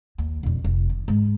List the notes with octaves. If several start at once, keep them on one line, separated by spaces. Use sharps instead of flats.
D#2
E1 F2
F1
D#3
G#2